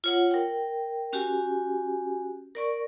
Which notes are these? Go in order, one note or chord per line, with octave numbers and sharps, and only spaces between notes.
F4 C#5 F#5
A#4 G5
C#4 F#4 G4 G#5
A#4 D5 C#6